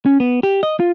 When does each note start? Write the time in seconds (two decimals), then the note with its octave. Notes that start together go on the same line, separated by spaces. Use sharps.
0.06 C#4
0.20 B3
0.43 G4
0.63 D#5
0.80 F4